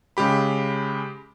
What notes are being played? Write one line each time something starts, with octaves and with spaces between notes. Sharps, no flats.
C#3 G#3 G4 B5